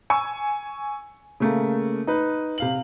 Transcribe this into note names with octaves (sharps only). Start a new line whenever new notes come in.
G#5 C#6 E6
C#3 A3 A#3
D#4 B4
C3 F5 F#7